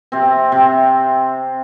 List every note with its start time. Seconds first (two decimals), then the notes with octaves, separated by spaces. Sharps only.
0.12 C3 C4
0.52 C3 C4